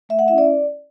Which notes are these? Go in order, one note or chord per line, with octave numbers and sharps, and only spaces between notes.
A3 E5
F#5
C#4 E4 E5
D5